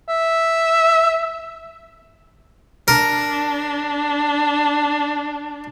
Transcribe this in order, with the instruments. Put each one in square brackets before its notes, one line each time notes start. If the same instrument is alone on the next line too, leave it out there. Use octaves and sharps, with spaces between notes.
[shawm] E5
[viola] D4 [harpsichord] A#4